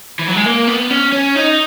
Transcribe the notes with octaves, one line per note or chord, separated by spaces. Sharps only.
E3
F#3
G#3
A#3
B3
C#4
C#4
D#4